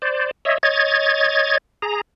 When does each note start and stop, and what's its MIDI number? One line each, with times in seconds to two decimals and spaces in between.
0.02 0.31 72
0.02 0.31 74
0.45 0.58 73
0.45 0.58 75
0.45 0.58 76
0.63 1.58 73
0.63 1.58 75
0.63 1.58 92
0.63 1.58 93
1.82 2.01 68
1.82 2.01 82